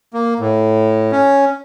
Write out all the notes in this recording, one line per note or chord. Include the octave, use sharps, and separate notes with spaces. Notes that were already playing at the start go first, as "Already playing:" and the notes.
A#3
A2
C#4